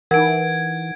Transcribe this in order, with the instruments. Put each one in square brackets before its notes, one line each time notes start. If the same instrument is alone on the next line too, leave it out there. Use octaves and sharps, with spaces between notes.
[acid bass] E3 [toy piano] D#4 A#4 [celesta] F#5 [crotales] G#6 D7